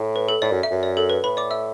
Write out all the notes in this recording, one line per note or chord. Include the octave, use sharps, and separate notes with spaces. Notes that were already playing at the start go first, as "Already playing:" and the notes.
Already playing: A2
B4
A4
A2 D5
F#2
E5
F#2
D5
A4
B4
A2 B4 B5
D5 D6
E5 E6